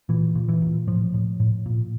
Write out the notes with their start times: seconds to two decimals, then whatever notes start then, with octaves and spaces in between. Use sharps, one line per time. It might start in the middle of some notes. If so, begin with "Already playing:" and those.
0.09 A#2 E3
0.35 A#2
0.48 E3
0.62 A#2
0.87 A2 F3
1.14 A2
1.40 A2
1.66 A#2